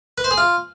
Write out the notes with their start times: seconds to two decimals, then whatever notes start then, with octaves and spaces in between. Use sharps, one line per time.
0.18 B4
0.24 C5
0.31 G#4
0.37 F4